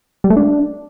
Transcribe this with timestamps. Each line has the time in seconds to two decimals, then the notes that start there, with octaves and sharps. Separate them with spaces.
0.24 G3
0.30 A3
0.37 D4